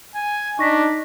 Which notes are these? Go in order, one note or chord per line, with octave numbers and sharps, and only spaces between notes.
G#5
D4 D#4 C#6 A#6 B6